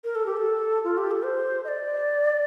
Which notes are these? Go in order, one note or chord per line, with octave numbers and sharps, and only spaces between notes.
A#4
A4
G4
A4
F4
G4
A4
C5
D#5
D5